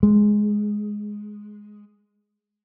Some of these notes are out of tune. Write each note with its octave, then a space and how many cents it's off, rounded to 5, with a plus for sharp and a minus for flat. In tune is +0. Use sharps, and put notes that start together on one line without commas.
G#3 +5